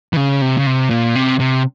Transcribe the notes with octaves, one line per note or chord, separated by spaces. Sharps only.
E3
C#3
C3
C#3
C3
A#2
C3
C3